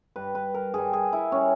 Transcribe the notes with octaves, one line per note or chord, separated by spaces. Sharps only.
G2 G3 B4
B4
A#4
G2 G3 G#4
G#4
E4
G3 C#4